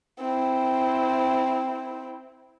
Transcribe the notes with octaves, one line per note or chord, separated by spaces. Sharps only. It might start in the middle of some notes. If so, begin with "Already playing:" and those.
C4 E4